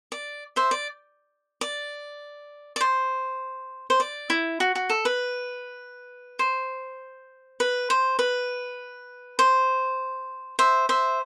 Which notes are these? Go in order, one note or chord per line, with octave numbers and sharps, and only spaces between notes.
D5
C5 E5
D5
D5
D5
C5
C5
D5
E4
F#4
F#4
A4
B4
C5
B4
C5
B4
C5
C5 E5
C5 E5